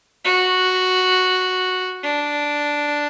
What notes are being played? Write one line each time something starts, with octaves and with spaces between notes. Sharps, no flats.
F#4
D4